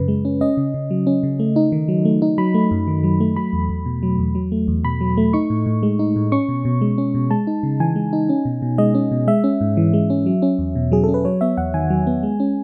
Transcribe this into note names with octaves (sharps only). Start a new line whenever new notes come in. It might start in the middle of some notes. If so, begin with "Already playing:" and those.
Already playing: F#2 C#3 B4
G#3
C#4
C#4 D#5
C#3
C#3
F#3
C#4
C#3
A3
D#4
D#3
F#3
A3
D#4
F#3 B5
A3
F#2
D#3
F#3
A3
F#3 B5
E2
E2
B2
F#3
E2
F#3
A3
E2
B2 B5
F#3
A3
D#4 C#6
A2
A2
G#3
D#4
A2
C#4 C#6
B2
B2
G#3
C#4
B2
G#3 A5
D#4
C#3
E3 G#5
G#3
D#4
C#4
B2
B2
G#3 D#5
C#4
B2
G#3 E5
C#4
G#2
E3
G#3
C#4
F#3
C#4
E2
B2
F#3 G#4
C#4 A4
B4
F#3 C#5
B3 E5
E2 F#5
D#3 G#5
F#3
B3
G#3
C#4